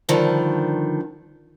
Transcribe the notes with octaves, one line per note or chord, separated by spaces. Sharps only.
G2 D3 D#3 F3